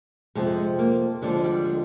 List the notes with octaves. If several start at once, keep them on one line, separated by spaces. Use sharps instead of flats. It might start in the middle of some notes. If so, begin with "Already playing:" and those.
F2 C3 F3 G#3
A#3
D#2 D3 F3 G#3
G3
G#3